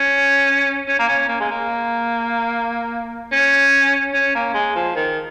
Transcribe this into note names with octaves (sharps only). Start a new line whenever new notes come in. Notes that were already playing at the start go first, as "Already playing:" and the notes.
Already playing: C#4
C#4
A#3
C#4
A#3
G#3
A#3
C#4
C#4
A#3
G#3
F3
D#3